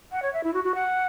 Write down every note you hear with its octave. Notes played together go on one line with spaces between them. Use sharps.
F#5
C#5
E5
E4
F#4
F#4
F#5